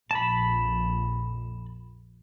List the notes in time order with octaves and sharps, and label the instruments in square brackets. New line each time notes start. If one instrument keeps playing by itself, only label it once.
[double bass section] A#1 F2 [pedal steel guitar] A5 B5